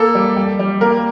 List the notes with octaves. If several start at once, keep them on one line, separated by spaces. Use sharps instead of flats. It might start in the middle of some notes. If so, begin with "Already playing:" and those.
Already playing: A#3 A4
G3
G3
G3
A#3 A#4